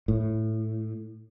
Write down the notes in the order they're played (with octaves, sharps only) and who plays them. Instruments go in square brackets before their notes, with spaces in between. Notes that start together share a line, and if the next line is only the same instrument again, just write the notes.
[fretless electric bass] A2